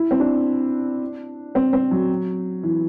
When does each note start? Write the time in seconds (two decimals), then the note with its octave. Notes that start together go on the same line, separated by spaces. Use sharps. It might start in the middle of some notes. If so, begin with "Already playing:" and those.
Already playing: E4
0.11 C4
0.20 D4
1.55 C4
1.73 C4
1.91 F#3
2.63 E3